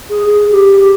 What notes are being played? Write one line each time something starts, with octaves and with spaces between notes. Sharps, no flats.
G#4
G#4
G4